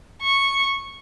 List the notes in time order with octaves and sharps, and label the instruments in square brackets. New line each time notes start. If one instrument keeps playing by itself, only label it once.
[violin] C#6